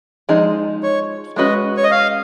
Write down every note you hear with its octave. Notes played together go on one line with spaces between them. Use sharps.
F3 G#3 D#4 G#4
C#5
G#3 C#4 F#4 B4 D#5
C#5
D#5
F5